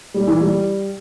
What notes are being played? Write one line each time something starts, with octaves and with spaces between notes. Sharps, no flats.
G3
E3
G3